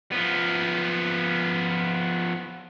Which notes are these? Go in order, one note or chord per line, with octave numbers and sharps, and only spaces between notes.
F3 B3